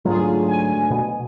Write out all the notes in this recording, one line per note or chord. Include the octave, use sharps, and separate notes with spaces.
D2 G#2 F#3 F4 G#4
G#5
B2